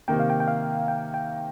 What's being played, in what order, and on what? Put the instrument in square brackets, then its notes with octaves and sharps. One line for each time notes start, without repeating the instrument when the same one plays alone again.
[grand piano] C3 D#3 A#3 [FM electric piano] G5
[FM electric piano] F5
G5
G5
F5
G5
G5